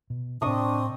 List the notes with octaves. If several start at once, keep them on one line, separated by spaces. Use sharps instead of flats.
B2
A2 C3 C4 D4 D#5 C#6 D#6